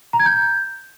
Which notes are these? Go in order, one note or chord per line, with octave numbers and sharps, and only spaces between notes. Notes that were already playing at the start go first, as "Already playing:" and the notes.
A#5
G#6
G6